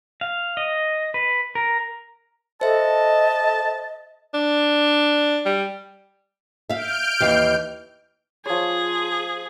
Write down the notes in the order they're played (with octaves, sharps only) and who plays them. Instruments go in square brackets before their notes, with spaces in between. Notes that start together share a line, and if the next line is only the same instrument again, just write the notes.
[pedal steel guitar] F5
D#5
B4
A#4
[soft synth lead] A4 [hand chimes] C5 E5 [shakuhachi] D#5 [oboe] A5
[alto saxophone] D4
G3
[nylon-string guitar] E5 F5 [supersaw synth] F6 G6 D7
[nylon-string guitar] D#2 E3 F5
[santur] F3 C#5 [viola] G#4